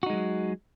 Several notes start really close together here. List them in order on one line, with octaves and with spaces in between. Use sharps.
F#4 D#4 G#3 F#3